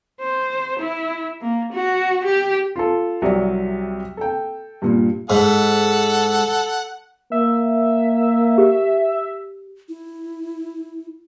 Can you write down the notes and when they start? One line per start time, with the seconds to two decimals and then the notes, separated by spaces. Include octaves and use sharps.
0.21 C5
0.80 E4
1.41 A#3
1.73 F#4
2.25 G4
2.76 F4 A4
3.22 C2 C3 F#3 D5
4.17 A4 G5
4.82 G2 A#2
5.30 G#2 A4 F#5
7.32 A#3 E5
8.58 G4
9.89 E4